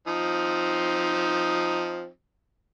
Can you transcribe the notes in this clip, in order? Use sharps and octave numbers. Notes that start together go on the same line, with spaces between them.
F3 C4 D#4